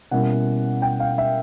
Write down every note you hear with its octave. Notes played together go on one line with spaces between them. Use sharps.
B2 G3 A#3 C#4 E4 F#5
G5
F5
E5